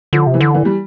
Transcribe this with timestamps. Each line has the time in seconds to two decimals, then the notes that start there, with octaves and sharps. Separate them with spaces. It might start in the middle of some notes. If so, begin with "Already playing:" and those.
0.13 D3 F3
0.27 C3
0.34 E3
0.41 D3
0.54 E3
0.65 G3